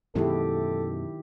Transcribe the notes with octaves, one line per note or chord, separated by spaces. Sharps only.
F#2 B2 D#3 G#3 E4 G4 A4